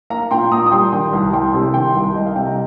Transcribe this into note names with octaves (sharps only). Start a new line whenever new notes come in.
A#3 F5 A#5
A#2 G5 C6
A#2 A#5 D#6
D#6
G3 G5 C6
D#3 G5 C6
C2
C2 G5 C6
C3
D#3 G5 C6
C2
C2 D#5
F5
C3 G5
A#5